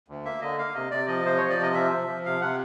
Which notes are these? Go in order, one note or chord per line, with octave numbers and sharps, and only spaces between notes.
D2
A#3 E5
D3 D#5
A#3 F5
C3 D#5
C3 D5
F3 D#5
C3 C5
F3 C#5
D5
C3 D#5
F3 E5
F3
F3
C3 F5
C3 F#5